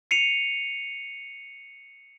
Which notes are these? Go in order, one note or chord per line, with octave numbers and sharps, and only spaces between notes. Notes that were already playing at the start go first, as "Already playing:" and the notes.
C7 C#7 D#7 F7